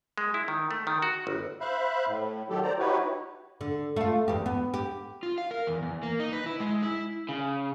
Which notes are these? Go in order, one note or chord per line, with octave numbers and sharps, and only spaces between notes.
G#3
E4
D#3
A3
D#3
F#4
G1
C5 E5 F5 B5 F#6
A2
D#3 F#3 G4 A4
C5 D5 A#5
D#4 E4 F#4 G4 B4 C#5
D3
A3 F4
E2 G4
B3
G4
F4
F5
A#4
E2
E2
A#3
D#4
B4
E4
G#3
E4
C#3